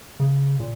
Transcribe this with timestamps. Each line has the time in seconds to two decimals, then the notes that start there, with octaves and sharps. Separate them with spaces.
0.20 C#3
0.60 A#2